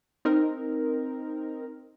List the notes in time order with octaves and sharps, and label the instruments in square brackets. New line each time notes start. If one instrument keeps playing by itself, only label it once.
[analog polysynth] C4 D#4 A#4